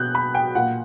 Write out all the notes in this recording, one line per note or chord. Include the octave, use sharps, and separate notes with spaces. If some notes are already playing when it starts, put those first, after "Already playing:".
Already playing: B2 F#6 G6
B5
G5
A#2 F#5